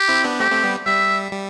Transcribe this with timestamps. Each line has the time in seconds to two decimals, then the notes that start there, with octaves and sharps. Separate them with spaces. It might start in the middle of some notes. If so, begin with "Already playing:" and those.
Already playing: G4
0.08 C4 E4
0.24 B3 D4
0.40 A3 C4 G4
0.51 A3 C4
0.64 G3 B3
0.86 G3 E5
1.32 G3